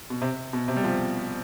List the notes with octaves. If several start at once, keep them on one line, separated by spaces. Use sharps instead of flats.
B2
C3
B2
C3
G3
F3